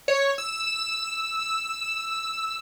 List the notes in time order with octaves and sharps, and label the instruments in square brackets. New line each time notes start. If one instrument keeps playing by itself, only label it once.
[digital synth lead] C#5
E6